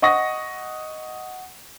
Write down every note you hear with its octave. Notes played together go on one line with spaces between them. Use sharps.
D#5 F#5 C#6 D#6 A#6